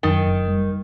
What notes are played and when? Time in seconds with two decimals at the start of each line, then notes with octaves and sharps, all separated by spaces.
0.03 F#2 D#3
0.26 F#1
0.48 G3